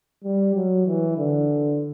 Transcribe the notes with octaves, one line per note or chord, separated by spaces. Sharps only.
G3
F#3
E3
D3